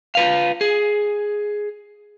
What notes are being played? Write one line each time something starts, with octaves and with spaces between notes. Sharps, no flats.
F4 B4 F5
G#4